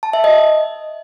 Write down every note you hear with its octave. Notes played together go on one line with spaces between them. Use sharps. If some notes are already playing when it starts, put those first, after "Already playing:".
A5
E5
D#5